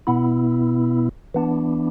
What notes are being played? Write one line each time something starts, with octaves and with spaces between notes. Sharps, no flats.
B2 B3 E4
E3 B3 D4